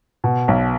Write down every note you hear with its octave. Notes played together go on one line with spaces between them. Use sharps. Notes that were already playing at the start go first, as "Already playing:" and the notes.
B2
B1